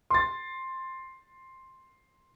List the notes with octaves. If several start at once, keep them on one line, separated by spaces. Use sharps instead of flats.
C6 A6